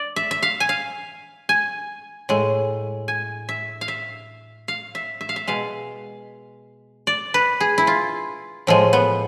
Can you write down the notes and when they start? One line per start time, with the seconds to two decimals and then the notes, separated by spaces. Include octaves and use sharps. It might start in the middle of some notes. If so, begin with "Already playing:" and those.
Already playing: D5
0.16 E5
0.31 E5
0.43 F5
0.60 G#5
0.69 F5
1.49 G#5
2.29 A2 G#3
3.08 G#5
3.49 E5
3.81 F5
3.88 E5
4.68 F5
4.95 E5
5.21 E5
5.29 F5
5.36 E5
5.47 B2 G#3 F5
7.07 D5
7.34 B4
7.60 G#4
7.78 E4
7.87 F4
8.67 A2 F3 G#3
8.93 B3